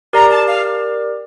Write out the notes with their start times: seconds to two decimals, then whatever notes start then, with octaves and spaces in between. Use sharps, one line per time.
0.13 G4 A#4 D5 A#5
0.30 A5
0.47 F5